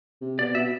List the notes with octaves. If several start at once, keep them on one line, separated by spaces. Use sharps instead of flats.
C3
B2 D5
B2 E5